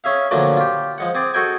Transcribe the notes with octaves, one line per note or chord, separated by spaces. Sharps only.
C#4 G#4 E5 F5
A#2 D3 F3 F#3 A3
F4 G4
F3 G#3 F#5
C4 G#4 D5
F#4 G#4 A4 D#5 G5 G#5